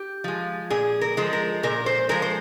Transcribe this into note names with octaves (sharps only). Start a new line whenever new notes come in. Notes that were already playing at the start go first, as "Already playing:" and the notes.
Already playing: G4
F3 G#3
A#2 G#4
A#4
F3 G#3
A#4
A#2 A#4
C5
F3 G#3 A#4
C5